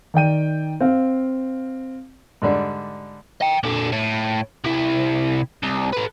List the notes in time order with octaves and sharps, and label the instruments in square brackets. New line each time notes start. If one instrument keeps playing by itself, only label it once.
[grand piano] D#3 D5 G5 D#7
C4 F5
[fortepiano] G#2 D3 G3 D4
[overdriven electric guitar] D#5 G5
A#2 D3
A2
C3 E4
C2
A4 B4